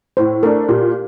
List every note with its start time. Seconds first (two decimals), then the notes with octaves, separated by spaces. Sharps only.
0.17 A2 C5
0.43 A3 D4 A#4
0.68 A#2 G4